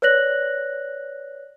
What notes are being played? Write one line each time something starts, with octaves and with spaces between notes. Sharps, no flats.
B4 C#5 D5 F#6 A#6 F#7